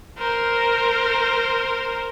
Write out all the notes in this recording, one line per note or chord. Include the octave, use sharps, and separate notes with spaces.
A#4 C5